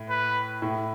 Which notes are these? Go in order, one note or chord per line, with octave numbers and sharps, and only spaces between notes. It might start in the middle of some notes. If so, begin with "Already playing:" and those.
Already playing: A2
B4
A2